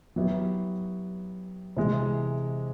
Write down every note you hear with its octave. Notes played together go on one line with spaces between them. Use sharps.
F#3 B3 E4 G4
C3 E3 G#3